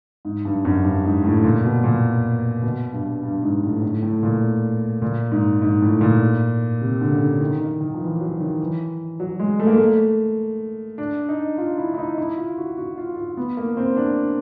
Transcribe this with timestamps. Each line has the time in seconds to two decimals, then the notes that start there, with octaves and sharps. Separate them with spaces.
0.25 G#2
0.45 G2
0.65 F#2
0.84 G2
1.04 G#2
1.24 A2
1.44 A#2
1.64 B2
1.84 A#2
2.63 B2
2.93 G2
3.23 G2
3.43 G#2
3.63 A2
3.83 A2
4.03 A2
4.23 A#2
5.02 A#2
5.32 G#2
5.62 G#2
5.82 A2
6.01 A#2
6.81 C3
7.01 D3
7.12 C#3
7.21 D3
7.40 D#3
7.60 D#3
7.80 D#3
7.94 F3
8.01 E3
8.21 F#3
8.40 D#3
8.60 E3
9.20 F#3
9.40 G#3
9.60 A3
9.67 A#3
9.74 A3
10.98 D4
11.29 D#4
11.58 F4
11.78 E4
11.94 E4
11.98 D#4
12.18 E4
12.37 F4
12.58 F#4
12.78 F#4
12.98 F4
13.17 F4
13.37 B3
13.57 A#3
13.77 C4
13.97 D4